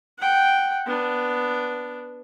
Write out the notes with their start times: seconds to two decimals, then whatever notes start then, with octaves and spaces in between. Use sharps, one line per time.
0.19 F#5 G5
0.86 B3 D4